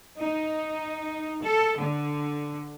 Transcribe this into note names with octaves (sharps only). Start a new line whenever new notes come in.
D#4
A4
D3